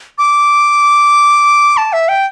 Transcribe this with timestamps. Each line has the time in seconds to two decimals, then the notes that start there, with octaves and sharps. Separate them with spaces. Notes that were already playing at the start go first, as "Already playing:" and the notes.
0.18 D6
1.77 A5
1.93 E5
2.09 G5